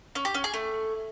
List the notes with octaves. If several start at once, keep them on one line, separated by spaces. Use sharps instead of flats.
C#4
G4
C#4
G#4
A3